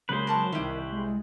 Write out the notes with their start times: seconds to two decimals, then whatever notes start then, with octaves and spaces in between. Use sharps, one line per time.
0.09 C#3 F#3 G#3 A#3 B4 C5
0.27 A#4 A5 C#6
0.52 C2 D#3 C#4 E4 G4 E5
0.92 G#3